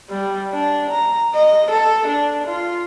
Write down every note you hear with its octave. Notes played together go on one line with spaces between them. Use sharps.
G3
D4
A#5
D#5
A4
D4
F4